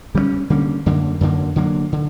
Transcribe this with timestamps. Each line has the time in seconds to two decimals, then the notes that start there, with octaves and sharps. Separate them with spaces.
0.14 D3 G3 A#3 C#4
0.50 D3 G3 A#3 C#4
0.86 F#2 D3 A#3
1.21 F#2 D3 A#3
1.56 D3 F#3 A#3
1.92 D3